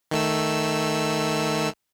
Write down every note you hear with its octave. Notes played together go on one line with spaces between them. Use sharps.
D#3 A3 E6